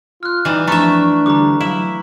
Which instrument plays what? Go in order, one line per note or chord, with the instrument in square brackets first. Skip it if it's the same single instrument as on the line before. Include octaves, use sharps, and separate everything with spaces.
[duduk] F4 [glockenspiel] F6 F#6
[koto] E3 G3 [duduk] D#4
[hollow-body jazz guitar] F2 B5 [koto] A3 E5 [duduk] D4 [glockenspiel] A#5 C#6
[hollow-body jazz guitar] D2 D3 G3 [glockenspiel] A#5 D6
[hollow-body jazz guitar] F#3 F5 [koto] E4